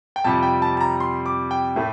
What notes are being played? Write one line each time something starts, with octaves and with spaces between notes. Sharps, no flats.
G5
F2 C3 G3 A5
G5
A5
A5
A#5
C6
D6
G5
A2 A3